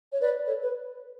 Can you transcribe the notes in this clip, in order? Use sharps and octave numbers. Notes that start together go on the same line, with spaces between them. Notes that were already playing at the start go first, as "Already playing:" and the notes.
C#5
B4 D5
A4 C#5
B4